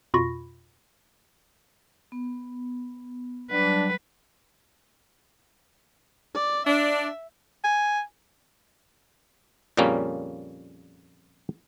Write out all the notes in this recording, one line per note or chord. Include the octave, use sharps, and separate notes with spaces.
F2 B2 F4 B5 C#6 A#6
B3
F#3 G3 D4 B4
D5
D4 E5
G#5
F2 A#2 C#3 G3 A#3 C#4